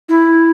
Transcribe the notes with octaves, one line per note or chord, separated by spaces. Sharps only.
E4